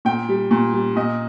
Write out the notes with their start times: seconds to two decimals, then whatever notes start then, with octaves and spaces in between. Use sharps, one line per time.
0.05 A#2 G5
0.29 G3
0.51 A#2
0.73 G3
0.96 A#2 D#5